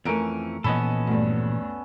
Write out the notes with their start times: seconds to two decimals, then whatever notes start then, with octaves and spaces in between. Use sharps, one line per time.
0.05 F2 E3 A3 C#4 A#4 D7
0.64 A#2 E3 F3 B3 C#4 A4 D#5 B5
1.07 D2 G2